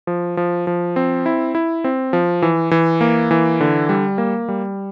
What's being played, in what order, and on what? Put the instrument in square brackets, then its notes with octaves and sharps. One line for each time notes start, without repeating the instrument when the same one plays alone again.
[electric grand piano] F3
F3
F3
C4
E4
E4
C4
F3
E3
E3
A#3
E3
D3
G3
A#3
G3